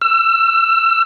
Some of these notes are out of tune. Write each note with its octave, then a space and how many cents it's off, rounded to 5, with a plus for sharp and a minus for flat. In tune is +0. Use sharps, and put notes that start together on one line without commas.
E6 +25